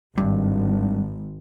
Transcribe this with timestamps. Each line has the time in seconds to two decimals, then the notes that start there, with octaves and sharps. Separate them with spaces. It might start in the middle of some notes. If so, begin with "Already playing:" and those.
0.18 G#1 G2